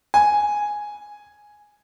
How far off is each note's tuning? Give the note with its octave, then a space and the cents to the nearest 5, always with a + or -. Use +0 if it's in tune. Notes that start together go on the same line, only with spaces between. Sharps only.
G#5 +0